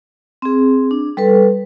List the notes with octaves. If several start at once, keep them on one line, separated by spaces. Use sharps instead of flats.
C4 G#4
D4
G3 A4 B4